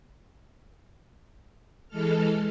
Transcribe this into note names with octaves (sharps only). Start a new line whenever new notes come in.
E3 G#3 A4 F6